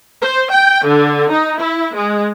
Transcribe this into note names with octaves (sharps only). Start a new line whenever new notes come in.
C5
G5
D3
D#4
E4
G#3